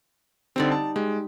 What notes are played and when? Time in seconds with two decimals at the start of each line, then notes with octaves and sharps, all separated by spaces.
0.56 D3 G3 C4 D#4 D5
0.72 A5
0.96 G#3 G4